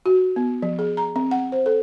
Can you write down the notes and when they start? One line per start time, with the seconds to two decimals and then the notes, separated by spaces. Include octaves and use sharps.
0.06 F#4
0.36 B3
0.62 F3
0.79 G#4
0.97 A#5
1.16 C4
1.31 F#5
1.52 C5
1.66 A4